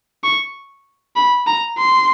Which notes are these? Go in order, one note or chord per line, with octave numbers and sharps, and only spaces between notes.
C#6
B5
A#5
C6